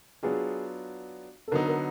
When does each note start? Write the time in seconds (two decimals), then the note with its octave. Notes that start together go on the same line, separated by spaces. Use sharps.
0.23 F#3 B3 D4 F4 G#4
1.48 A4
1.51 D3 F#3 B3 D#4 A#4
1.68 A#4